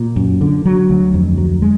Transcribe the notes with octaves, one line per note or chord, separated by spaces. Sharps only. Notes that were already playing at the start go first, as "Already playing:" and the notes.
Already playing: A#2
F#2
D3
F#3
D2
F2
F#3
G#3